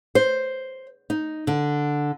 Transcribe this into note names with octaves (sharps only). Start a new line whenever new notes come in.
C5
D#4
D3